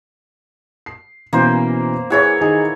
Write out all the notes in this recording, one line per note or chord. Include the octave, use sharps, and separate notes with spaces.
C7
B2 E3 A#3 C#4 C5
E3 E4 G#4 C#5 F#5
D#3 D#4 G#4